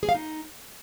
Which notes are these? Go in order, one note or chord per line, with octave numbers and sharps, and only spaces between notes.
G#4
F5
D#4